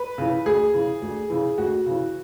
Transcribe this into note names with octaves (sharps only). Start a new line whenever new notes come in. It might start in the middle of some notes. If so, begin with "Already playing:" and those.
Already playing: B4
C#3 E3
D2 G#4
C#3 E3
D2
C#3 E3
D2 F#4
C#3 E3